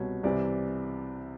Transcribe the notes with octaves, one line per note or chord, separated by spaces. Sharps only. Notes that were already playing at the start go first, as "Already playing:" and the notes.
Already playing: C2 B2 C#5
C2 C3 E3 D5